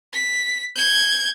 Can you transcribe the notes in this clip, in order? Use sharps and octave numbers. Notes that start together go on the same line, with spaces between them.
B6
G6 G#6